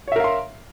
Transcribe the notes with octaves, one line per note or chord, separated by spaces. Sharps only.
A#4 C#5 E5 F5 C6